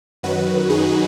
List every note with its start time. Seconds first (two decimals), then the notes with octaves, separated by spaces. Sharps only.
0.23 F#2 D#3 F#3 F#4 B4
0.70 D#4 G#4